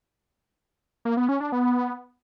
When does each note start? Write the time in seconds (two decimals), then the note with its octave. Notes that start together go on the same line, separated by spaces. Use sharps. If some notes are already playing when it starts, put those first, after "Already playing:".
1.05 A#3
1.17 B3
1.29 C#4
1.41 D4
1.52 B3